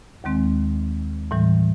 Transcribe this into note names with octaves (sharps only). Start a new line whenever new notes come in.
D#2 D#3 G#3 C4
A2 E3 G3